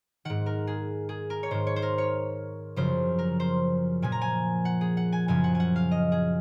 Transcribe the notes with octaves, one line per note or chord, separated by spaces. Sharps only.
G#2 D#3 F#5
A#4
G#4
G#4
A#4
C#5
G#2 D#3 C5
C#5
C5
A#4
C#5
F#2 C#3 F3 C5
A#4
C5
A#2 F3 G#5
A#5
G#5
F#5
G#4
F#5
G#5
F#2 C#3 F3 G#5
F#5
G#5
F#5
F5
D#5
G#4